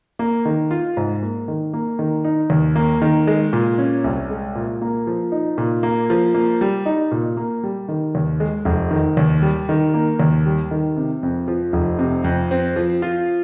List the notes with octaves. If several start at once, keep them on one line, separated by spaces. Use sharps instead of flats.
A#3
D#3
F4
G#2
A#3
D#3
A#3
D#3
D#4
D#2
A#3
D#3
G#3
A#2
C#4
C2
G#3
A#2
A#3
F3
D#4
A#2
A#3
F3
A#3
G3
D#4
A#2
A#3
G3
D#3
D#2
G#3
F1
D#3
D#2
G3
D#3
A#3
D#2
G3
D#3
C3
F2
F3
F1
C3
F2
C4
F3
F4